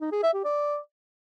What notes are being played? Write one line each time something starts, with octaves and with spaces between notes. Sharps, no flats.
D#4
G#4
E5
G4
D5